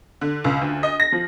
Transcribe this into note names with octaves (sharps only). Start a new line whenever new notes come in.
D3
C#2
D2
D#5
A#6
F3